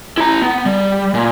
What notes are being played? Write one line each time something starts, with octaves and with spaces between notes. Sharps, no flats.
E4 A#5
B3
G3
A#2